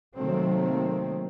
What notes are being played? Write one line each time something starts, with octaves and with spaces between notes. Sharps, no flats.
C3 D#3 F#3 A3 A#3 C4